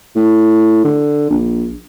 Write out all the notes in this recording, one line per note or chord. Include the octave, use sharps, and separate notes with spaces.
A2
D3
A#1